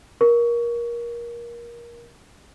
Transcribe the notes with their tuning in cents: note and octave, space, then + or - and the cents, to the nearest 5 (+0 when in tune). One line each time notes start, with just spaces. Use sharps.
A#4 +20 C#6 +20